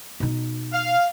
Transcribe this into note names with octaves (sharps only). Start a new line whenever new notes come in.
B2 D#4
F5